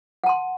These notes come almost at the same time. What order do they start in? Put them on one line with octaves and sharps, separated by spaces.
F#5 A5 C6